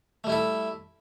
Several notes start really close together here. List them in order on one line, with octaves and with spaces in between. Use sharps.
A3 G3 E4 A4